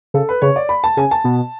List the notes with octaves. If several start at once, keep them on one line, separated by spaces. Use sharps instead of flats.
C#3 A4
B4
C#3 C#5
D5
B5
A5
C#3 G#5
A5
B2